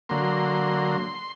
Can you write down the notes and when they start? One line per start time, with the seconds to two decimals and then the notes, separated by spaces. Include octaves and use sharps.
0.09 D3 F#3 A#3 C6